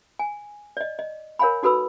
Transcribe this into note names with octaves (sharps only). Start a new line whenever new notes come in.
G#5
D5 D#5
D#5
A#4 C#5 F5 G#5 B5
D#4 F#4 A4 B4 B5 E6